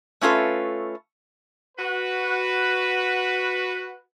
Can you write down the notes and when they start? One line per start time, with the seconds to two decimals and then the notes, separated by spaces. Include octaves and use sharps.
0.21 A3 C#4 F4 A4 B4
1.78 F#4 B4